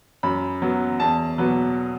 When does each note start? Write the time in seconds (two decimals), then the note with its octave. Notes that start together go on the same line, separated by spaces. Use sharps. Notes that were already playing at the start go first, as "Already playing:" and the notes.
0.23 F#2 B5
0.62 F#3 B3
1.00 E2 A5
1.38 B2 F#3 B3